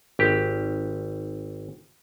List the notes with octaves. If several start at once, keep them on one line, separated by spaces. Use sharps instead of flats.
G#1 G4